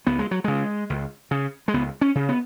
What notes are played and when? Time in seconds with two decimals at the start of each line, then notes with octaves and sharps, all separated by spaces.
0.06 C#2 B3
0.19 G#3
0.31 F#3
0.44 C#3 G#3
0.90 C#2
1.31 C#3
1.68 G#3
1.74 C#2 B3
2.01 C#4
2.15 C#3
2.29 B3